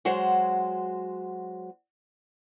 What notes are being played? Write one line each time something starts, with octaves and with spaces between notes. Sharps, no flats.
F#3 G#3 F#4 C5